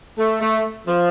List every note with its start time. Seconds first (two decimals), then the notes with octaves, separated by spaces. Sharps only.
0.18 A3
0.41 A3
0.87 F3